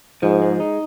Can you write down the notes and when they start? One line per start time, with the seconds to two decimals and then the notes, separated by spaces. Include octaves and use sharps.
0.22 G#2 F3
0.42 G#3
0.60 D#4